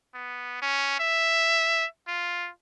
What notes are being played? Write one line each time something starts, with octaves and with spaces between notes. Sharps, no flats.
B3
C#4
E5
F4